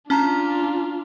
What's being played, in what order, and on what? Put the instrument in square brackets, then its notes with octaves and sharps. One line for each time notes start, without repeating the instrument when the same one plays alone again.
[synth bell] C#4 A5 A#5 [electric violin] D4 F4